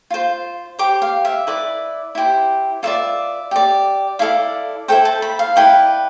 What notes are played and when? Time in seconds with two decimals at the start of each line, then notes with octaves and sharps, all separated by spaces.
0.10 F4 C5
0.79 G4 C5 D6
1.02 F5
1.25 E5
1.47 E4 B4 D5
2.15 E4 G4 C5
2.83 F4 B4 D5 E5
3.51 G4 D5
4.19 E4 A4 D5 F5
4.88 E4 A4 C5 G5
5.05 A5
5.22 B5
5.39 F5
5.56 E4 B4 D5 G5